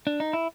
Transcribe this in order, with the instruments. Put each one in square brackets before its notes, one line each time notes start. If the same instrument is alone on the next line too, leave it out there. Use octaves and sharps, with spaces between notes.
[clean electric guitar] D4
D#4
E4